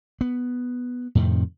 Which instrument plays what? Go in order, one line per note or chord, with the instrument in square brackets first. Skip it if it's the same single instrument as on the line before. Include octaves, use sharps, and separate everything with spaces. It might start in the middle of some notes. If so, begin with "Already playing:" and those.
[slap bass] B3
F2 A2 C3 D#3